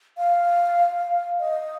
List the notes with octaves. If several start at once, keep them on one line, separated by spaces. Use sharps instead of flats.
F5
D#5